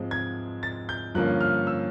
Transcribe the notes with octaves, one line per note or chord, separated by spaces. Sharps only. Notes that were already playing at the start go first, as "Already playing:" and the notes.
Already playing: G#2 F3 G#3 C4
G#6
A6
G6
G2 D3 F3 A#3 C#4 F#6
F6
E6